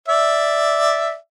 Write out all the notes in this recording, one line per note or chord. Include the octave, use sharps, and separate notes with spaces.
D5 E5